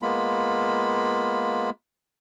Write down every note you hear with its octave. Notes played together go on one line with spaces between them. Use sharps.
G#3 A#3 B3 F4 B5